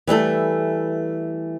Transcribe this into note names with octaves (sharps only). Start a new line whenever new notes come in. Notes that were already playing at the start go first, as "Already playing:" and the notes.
E3 G3 A3 A4